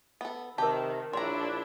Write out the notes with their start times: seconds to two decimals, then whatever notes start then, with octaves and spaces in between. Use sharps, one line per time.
0.21 B3 A4
0.58 C3 D#3 G4 A#4 A5
1.13 A#1 D4 E4 C#5 A#5 C6